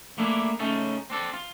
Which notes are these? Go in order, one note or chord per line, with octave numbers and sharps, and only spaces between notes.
A3 A#3 D4 E4 G#4
C#3 A3 C#4 D#4 A4
C4 D4 A4
F4